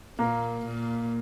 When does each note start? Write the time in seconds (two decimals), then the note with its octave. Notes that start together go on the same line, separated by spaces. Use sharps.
0.18 A#2 A#3
0.65 A#2